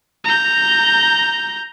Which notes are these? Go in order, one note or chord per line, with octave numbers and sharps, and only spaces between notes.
A#5 G6